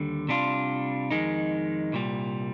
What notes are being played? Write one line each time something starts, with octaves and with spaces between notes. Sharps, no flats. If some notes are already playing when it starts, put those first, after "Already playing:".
Already playing: D#2 D3 G3
C3 G3 D4 F4
F2 D#3 G#3 D#4
C2 A#2 G3